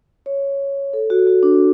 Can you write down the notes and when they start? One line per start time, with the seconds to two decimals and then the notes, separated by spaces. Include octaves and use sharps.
0.26 C#5
0.93 A4
1.10 F#4
1.27 F#4
1.43 D4